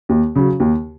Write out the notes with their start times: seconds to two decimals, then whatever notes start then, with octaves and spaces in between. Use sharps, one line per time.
0.09 D#2
0.35 C#3 F#3 C#4
0.60 D#2